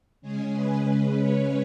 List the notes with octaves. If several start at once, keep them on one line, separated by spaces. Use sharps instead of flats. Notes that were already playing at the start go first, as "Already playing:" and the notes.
C#3 G#3 C#4 G#4
B4
C#3 G#3 C#4 B4
C#5